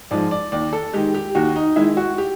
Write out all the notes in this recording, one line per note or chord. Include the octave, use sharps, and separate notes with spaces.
G#2 F3 G#3 D5
D5
D#2 D5
A4
D#3 G#3 G4
G4
D#2 F#4
D#4
D#3 G#3 E4
F#4
G4